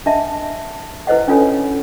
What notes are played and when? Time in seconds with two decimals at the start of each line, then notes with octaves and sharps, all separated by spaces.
0.06 D4 D#5 E5 F#5 A5
1.07 E4 B4 C5 D#5 F#5
1.28 C#4 D4 F4 A4 C#5 G#5